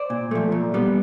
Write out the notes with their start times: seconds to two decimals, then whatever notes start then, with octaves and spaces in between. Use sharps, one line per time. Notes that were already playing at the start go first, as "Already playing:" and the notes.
Already playing: C5 D5
0.10 A#2
0.31 F3 A3
0.52 A#2
0.74 G3 B3